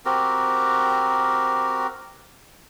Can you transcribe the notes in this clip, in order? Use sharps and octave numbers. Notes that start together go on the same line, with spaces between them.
C4 F#4 G4 A#4